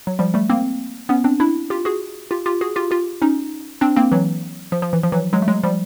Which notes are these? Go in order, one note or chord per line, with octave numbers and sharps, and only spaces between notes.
F#3
F3 G3
G3 A3
A#3 C4
B3 C#4
C4 D4
D4 E4
F4 G4
F#4 G#4
F4 G4
F4 G4
F#4 G#4
F4 G4
F4 G4
C#4 D#4
C4 D4
A#3 C4
E3 F#3
F3
F3
E3
F3
E3 F#3
F#3 G#3
A3
F#3 G#3
F3 G3